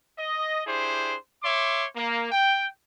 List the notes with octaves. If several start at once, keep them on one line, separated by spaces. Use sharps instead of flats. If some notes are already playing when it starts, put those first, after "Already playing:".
D#5
D4 E4 G4 G#4 C5
C#5 E5 C6 D6
A#3
G5